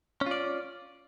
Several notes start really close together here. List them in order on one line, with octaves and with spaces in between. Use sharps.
C#4 F4 D5